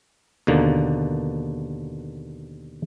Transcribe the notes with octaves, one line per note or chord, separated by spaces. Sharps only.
D#2 B2 D3 A#3